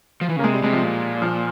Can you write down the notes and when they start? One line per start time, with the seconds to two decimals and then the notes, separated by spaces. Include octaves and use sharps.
0.21 F3
0.29 E3
0.36 C#3
0.39 A#3
0.44 C3 G#3
0.54 G3
0.63 C3 G#3
0.73 F3
0.83 A#2
1.22 F3